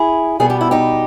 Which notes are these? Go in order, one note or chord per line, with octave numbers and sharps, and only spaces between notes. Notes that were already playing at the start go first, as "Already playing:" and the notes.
Already playing: E4 G#4
B2 G3 B3 G#4
G4
E4
D#4 G4